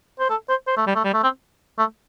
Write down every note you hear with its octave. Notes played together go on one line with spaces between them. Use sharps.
C5
A4
C5
C5
A3
G3
A3
G3
A3
C4
A3